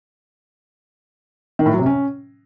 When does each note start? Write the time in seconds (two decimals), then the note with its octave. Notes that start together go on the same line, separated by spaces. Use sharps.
1.59 D#3
1.66 A2
1.73 F#3
1.79 C3
1.86 C#4